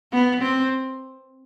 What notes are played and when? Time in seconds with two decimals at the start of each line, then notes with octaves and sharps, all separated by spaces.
0.12 B3
0.42 C4